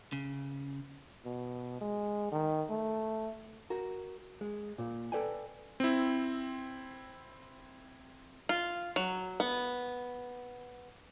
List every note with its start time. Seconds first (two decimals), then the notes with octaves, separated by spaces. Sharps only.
0.12 C#3
1.25 B2
1.81 G#3
2.32 D#3
2.70 A3
3.70 F#4 A#4
4.41 G#3
4.78 A#2
5.12 A4 B4 D5 G5 G#5
5.80 C4 E4
8.49 F4
8.96 F#3
9.40 B3